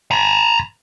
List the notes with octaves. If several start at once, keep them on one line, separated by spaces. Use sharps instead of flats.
A#5 B5